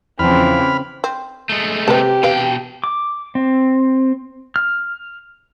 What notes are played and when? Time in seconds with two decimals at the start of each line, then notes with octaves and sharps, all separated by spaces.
0.19 E2 C#3 E3 F3 C4 B5 F6
1.04 C4
1.49 G#3 A3
1.88 C3 G4 B4 A5
2.23 B2 B4 F5 G5
2.84 D6
3.35 C4
4.56 F6